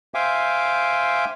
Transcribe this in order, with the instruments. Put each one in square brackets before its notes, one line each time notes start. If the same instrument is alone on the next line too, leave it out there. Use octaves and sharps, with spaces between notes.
[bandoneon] C5 E5 F5 G5 G#5 D6